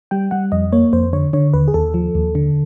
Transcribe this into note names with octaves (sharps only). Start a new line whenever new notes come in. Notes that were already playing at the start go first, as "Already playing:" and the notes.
G3 G5
G3 F#5
F2 D#5
A#3 C#5
F2 C5
D3 C#5
D3 C#5
D#2 B4
G#4
D#2 A4
F3
D#2
D3